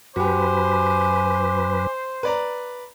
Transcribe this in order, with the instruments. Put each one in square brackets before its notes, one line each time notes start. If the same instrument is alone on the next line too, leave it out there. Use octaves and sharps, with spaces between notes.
[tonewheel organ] F#2 B4 [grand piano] F#4 G4 [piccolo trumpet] C5 [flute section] G#5 B5 D6
[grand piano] B4 D5 A#5